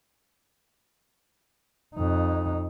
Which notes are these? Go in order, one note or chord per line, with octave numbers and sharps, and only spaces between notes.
F2 D#4